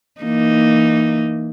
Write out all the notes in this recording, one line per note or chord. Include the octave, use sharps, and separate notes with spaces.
E3 A#3 D#4